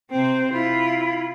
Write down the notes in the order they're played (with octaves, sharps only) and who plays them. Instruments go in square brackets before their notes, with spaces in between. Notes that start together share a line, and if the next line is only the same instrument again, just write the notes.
[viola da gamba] C3 C4 [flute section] C5 G5
[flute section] E4 B5 [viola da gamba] F4